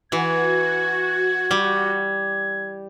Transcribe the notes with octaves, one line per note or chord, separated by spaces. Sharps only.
E3 F#4 G#6
G3